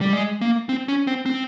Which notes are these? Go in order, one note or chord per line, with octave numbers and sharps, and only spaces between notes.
G3
G#3
A#3
C4
C#4
C4
C4